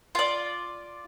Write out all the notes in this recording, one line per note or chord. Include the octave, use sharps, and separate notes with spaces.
F4 D5